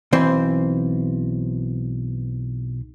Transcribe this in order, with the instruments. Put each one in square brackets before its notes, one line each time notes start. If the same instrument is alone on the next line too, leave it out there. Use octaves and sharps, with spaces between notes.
[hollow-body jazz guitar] B1 E3 C4 C5